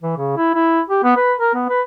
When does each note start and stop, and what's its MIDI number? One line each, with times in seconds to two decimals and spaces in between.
0.02 0.14 52
0.17 0.34 49
0.37 0.53 64
0.55 0.80 64
0.89 1.03 67
1.03 1.13 59
1.16 1.33 71
1.39 1.53 70
1.54 1.64 59
1.69 1.81 71